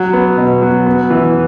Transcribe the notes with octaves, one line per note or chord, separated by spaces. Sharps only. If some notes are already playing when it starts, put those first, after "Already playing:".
Already playing: F#3
B3
B2
F#3
B3
E3